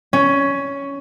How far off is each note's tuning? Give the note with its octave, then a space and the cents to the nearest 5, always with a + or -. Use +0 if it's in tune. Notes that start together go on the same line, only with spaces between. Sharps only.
C#4 +10